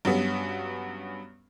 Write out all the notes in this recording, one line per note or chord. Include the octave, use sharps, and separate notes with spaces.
G2 F#3 B3 C#4